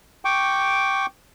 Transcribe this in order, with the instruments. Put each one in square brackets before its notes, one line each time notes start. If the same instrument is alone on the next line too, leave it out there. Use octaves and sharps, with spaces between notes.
[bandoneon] G5 C#6 D6